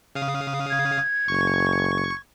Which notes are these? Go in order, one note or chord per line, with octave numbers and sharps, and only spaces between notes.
C#3 F5 D#6
G#6
F#1 C#6